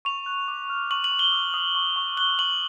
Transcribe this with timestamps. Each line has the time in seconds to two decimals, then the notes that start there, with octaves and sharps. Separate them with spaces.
0.05 C#6 F7
0.26 F#6
0.48 D6
0.69 F6
0.91 C#6 F#7
1.04 F#7
1.12 C#6
1.19 G7
1.32 D#6
1.54 D#6
1.75 C#6
1.96 C#6
2.17 F#6 G7
2.39 C#6 F#7